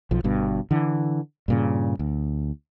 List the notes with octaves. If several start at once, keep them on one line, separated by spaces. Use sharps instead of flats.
B1 F3
G1 G2 B2
D3 E3
G2 A#2 C#3
D2